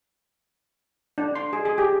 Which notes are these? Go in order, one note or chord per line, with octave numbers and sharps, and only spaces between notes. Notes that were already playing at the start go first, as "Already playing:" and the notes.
D4
C6
G#4
G#4
G4